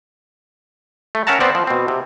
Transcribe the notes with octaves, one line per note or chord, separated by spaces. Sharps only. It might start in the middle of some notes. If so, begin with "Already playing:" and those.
A3
C#4 A#4 E5 F#5 A5 A#5
B3 C4 C5 D5
F3
B2 C4
C3